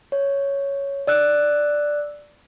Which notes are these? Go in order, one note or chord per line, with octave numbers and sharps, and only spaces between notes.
C#5
D5 E6 F#6